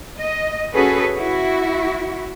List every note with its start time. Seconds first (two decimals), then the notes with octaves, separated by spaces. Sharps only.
0.20 D#5
0.74 C#4 F#4 G#4 A4 B4
1.16 E4 F#4